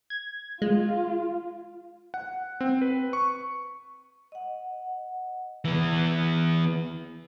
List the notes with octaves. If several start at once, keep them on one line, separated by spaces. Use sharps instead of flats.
G#6
G#3 F4
F#5
C4
B4
C#6
D#5 F#5
E3 B3